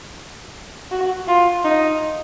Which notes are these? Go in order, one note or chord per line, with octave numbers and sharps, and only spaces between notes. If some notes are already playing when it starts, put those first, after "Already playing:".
F#4
F4
D#4